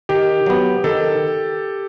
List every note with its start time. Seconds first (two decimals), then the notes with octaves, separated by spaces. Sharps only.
0.09 D#3 G4
0.46 F#3 B3
0.84 D#3 A4